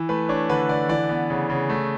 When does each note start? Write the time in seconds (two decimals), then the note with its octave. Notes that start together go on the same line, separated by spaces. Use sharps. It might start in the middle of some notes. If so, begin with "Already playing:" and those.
Already playing: E3
0.09 A3 B4
0.29 D4 C#5
0.50 D3 B4
0.69 D3 D5
0.89 E3 D5
1.09 B3
1.30 C#3
1.50 C#3
1.69 A3